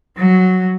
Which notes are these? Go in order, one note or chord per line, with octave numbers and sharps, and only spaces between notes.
F#3